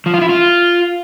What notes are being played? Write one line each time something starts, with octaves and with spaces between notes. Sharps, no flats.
F3
F4
E4
F4